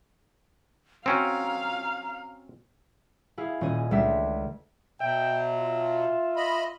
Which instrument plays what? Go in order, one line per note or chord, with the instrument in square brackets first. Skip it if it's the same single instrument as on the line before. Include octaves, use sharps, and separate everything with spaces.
[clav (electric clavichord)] C4 C#4 F#4 [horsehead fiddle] F5 [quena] A#5
[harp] E4 G#4 F5
D#1 C#4 G#4 D#5 G#5 D#7
C#2 G#3 A3 D4 E5 B6
[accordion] B2 F#3 [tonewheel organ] E5 [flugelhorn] G5
[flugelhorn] F4
[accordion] D#5 B5